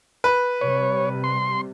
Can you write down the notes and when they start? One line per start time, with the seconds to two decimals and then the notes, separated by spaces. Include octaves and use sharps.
0.24 B4
0.61 C3 G3 C#5
1.24 C6